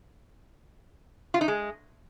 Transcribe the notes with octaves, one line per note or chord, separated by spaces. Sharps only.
F4
D#4
G#3